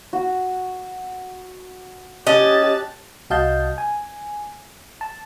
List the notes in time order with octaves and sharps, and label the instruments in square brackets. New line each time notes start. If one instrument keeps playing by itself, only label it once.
[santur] F#4
[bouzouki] C#4 D#5 [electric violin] G4 A6 [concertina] A5 F#6
[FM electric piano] C2 F#4 D#5 F5 A5 G6
G#5
A5